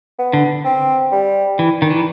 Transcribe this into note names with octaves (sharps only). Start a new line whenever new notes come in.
B3
D3
C4
G3
E3
D#3
E3